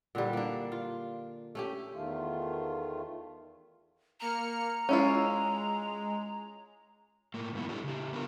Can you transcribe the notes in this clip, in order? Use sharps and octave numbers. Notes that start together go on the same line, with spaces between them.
A#2 D3 E3 G3
A#3 D4
F4
A3 C#4 G4
E2 D#3 A3 F4
A#3 A#5 F6 C#7
G#3 C#4 E4 F4
A2 A#3
G2 D#3 A#3 B3 E4
A#3 D4 E4 G4 A4
C#3 G4
B3 D4 F4 A#4